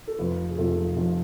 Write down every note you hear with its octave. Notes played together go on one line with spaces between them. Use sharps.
A4
F1 F2 F3 B4
G#4
F1 F2 F3 A4
F1 F2 F3